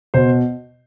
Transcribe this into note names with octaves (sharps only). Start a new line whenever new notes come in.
B2 C5